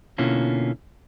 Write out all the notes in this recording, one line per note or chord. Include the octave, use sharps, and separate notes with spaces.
B2 D3 A#3 C#4 E4 F4